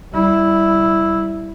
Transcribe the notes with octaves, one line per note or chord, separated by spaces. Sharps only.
G3 E4